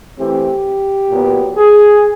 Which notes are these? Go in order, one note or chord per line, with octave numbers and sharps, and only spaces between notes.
E3 A3 C4 G4
A#2 F#3 B3
G#4